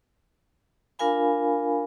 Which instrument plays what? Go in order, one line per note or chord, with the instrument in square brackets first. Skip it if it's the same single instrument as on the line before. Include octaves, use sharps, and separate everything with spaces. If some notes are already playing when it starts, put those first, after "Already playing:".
[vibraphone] D4 F4 A#4 F5 G#5 B5